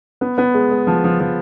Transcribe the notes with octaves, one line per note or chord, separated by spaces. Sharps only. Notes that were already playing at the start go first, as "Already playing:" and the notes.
B3
B3
G#3
G#3
F3
F3
F3